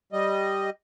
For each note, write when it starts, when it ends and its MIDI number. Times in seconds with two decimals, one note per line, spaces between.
0.13 0.70 55
0.13 0.70 75